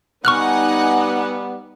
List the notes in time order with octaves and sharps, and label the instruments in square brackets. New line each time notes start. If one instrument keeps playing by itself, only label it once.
[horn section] G3 B3 [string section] D#4 F#5 G#5 [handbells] C#6 F6 F#6